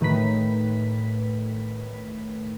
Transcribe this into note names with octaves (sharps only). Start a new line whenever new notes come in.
A2 D#3 B4 B6